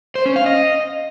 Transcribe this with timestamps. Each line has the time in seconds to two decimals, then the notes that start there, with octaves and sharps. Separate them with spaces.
0.15 C5
0.26 C#4
0.36 F5
0.46 D#5